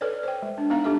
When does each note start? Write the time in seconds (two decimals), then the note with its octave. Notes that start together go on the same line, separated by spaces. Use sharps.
0.01 A4 B4 C#5 D5
0.23 C5 G5
0.42 G#3
0.58 D4
0.70 G#3 B3 D#4 F5 A#5
0.84 G#3 D4 G4 A4 E5